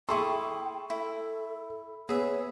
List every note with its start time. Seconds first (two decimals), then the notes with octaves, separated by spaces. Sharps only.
0.09 E4 G#4 A4 G5 C6 C#6
0.90 E4 A4
2.09 B3 G#4 C#5 E5